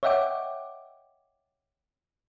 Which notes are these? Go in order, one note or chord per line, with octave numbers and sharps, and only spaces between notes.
C#5 D#5 E5 F#5 G5 D6